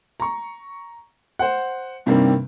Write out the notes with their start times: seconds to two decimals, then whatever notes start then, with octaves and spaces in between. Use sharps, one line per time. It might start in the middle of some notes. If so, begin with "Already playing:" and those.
0.20 A#5 C#6
1.39 C5 F#5
2.06 G2 C3 D#3 G3 A#3 C4